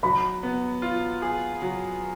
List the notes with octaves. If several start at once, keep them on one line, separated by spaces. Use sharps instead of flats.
F#3 B5
B3
F4
G#4
F#3